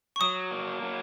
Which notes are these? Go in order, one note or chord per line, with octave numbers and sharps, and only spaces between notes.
C#6
F#3 D#6
A#3
F#3